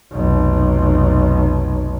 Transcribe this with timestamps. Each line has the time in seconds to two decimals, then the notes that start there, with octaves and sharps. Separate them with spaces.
0.11 F1 B1